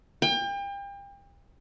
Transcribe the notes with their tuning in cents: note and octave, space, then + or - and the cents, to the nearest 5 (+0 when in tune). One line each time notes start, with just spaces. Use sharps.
G5 +35